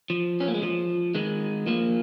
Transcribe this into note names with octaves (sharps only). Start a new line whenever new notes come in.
F3
C#4
A#3
G#3
F3
D#3 G#3
F3 A#3